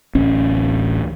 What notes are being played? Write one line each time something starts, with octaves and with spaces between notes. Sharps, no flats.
D1 A1 C#4